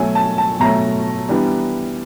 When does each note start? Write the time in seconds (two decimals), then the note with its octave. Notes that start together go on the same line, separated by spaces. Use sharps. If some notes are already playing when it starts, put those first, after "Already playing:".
Already playing: B2 F#3 A3 G#5
0.15 A5
0.38 A5
0.60 B2 F#3 A3 A#5
1.29 E3 G3 B3 D4